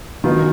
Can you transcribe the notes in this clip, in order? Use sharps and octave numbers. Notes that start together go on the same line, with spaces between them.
D#3 F#3 B3 F4